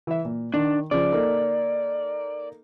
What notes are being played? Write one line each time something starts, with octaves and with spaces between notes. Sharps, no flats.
E3 E5
A#2
D#3 D4
C#3 F3 D5
A#3 D#4 A4